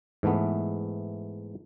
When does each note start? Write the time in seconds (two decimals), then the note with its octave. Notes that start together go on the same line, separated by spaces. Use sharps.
0.23 G#2 E3 A3 B3